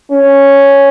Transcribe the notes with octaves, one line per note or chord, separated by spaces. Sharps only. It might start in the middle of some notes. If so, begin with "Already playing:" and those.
C#4